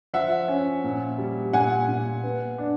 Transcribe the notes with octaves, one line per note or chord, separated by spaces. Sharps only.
F3 E5 F#5
C#4
A#2
G3
A#2 F#5 G#5
A#2
B3
D4